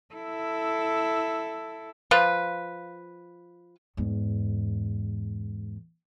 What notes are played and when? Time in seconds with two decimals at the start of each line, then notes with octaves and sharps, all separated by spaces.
0.14 E4 A4
2.11 F3 F4 B4
3.97 E2 G#2